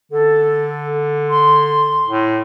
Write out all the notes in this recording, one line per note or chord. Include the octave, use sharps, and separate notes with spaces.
D3 A4
C6
A2